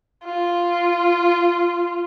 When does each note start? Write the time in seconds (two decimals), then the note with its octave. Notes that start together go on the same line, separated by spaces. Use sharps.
0.25 F4